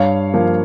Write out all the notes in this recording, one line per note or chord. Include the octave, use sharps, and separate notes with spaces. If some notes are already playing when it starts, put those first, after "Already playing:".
Already playing: G2 C#5 F5
F3 A#3